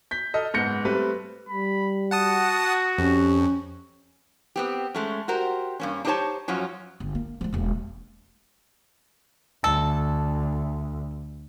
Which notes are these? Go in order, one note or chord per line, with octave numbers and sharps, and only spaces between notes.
G6 B6
A4 D#5 F6
F#1 G#2 B3 G6 A#6 C#7
G3 A3 C4 B4
G3 B5
F#4 F#5 A5 D#6
F2 C#4 G4
B3 C4 G4
G#3 A3 C#4
F#4 G4 A#4 C5
G2 A#3 C#4
D4 D#4 G4 C5 C#5 A5
F#2 F3 F#3 C#4
G1
A#3
F3 G#3
E1 A#3
D2 A4